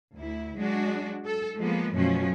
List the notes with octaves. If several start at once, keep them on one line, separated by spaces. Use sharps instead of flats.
D2 E4
F#3 G#3 D4 F#4
A4
F3 G#3 A#3 B3
F#2 B2 F3 F#3 A3 C#4